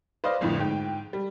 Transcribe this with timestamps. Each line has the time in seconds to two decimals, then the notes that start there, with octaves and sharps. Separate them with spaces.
0.24 B4 C5 D5 D#5 F5
0.41 G1 F2 A2 D3 F3
0.59 G#2 G5
1.13 G3